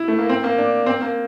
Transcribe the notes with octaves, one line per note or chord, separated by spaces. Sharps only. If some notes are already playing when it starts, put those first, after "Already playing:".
Already playing: E4
A3
A#3
C4
A#3
D4
C4
A#3